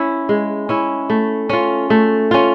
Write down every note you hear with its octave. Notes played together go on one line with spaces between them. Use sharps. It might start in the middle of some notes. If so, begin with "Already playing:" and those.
Already playing: C#4 E4
G#3
C#4 E4
A3
C#4 F4
A3
C#4 F4